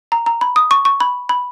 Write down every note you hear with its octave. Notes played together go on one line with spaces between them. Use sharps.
A#5
A#5
B5
D#6
C#6
C#6
B5
B5